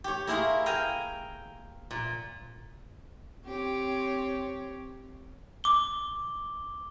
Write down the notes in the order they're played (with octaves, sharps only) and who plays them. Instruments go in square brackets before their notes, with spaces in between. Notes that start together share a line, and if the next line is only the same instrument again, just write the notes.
[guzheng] G4 C#5
A#3 E4 G#4 A#4 C6
F5 G5 G#5 A#5
A#2
[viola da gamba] C4 G4 C#5
[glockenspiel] D6 G7